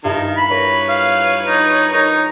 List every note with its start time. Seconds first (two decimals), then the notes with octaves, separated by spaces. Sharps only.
0.04 G2 D#3 E4 F4
0.37 B5
0.51 A#4 B4 C#5
0.89 F5
1.47 D#4 C#7
1.92 D#4 A#4 D#6